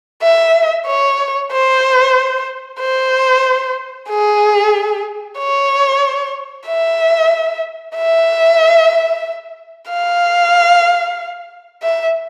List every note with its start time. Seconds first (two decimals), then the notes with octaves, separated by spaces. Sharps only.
0.22 E5
0.87 C#5
1.52 C5
2.80 C5
4.10 G#4
5.39 C#5
6.68 E5
7.96 E5
9.91 F5
11.83 E5